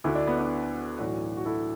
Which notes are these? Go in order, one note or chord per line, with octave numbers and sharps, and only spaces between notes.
D2 D3 E4
D4
B3
D4
B1 A2 E3 D4 F#4
F#4
E4 A4